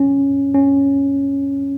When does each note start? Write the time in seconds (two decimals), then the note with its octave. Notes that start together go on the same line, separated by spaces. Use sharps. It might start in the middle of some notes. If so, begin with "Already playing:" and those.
Already playing: C#4
0.54 C#4